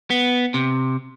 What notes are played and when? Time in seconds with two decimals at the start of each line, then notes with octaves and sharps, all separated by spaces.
0.10 B3
0.54 C3